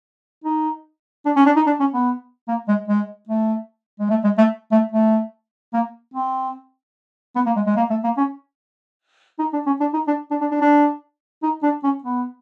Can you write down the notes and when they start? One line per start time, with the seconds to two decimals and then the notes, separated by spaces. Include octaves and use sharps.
0.44 D#4
1.26 D4
1.36 C#4
1.46 D4
1.56 D#4
1.66 D4
1.80 C#4
1.94 B3
2.48 A#3
2.68 G#3
2.88 G#3
3.29 A3
4.00 G#3
4.10 A3
4.24 G#3
4.38 A3
4.72 A3
4.92 A3
5.73 A#3
6.14 C4
7.36 B3
7.46 A#3
7.56 G#3
7.66 G#3
7.77 A#3
7.90 A3
8.04 A#3
8.17 C#4
9.39 D#4
9.53 D4
9.66 C#4
9.80 D4
9.94 D#4
10.07 D4
10.31 D4
10.41 D4
10.51 D4
10.61 D4
11.43 D#4
11.63 D4
11.83 C#4
12.03 B3